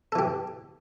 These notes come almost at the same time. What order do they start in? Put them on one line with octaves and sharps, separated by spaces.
A4 E3 G4